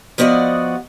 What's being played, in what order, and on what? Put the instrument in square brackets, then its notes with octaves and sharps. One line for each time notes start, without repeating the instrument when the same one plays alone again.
[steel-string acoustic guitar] F3 B3 F#4 D5 D#5